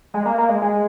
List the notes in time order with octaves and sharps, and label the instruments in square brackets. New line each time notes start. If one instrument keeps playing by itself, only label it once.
[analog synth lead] G#3
A#3
A#3
G#3
G#3